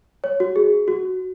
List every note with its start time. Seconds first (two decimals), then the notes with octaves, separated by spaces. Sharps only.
0.24 C#5
0.40 F#4
0.56 G#4
0.88 F#4